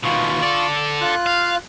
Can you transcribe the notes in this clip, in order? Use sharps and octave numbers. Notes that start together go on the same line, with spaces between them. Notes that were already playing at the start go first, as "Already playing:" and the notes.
D#2 B2 F4 C#6
A4 D5
F4 F#6
F5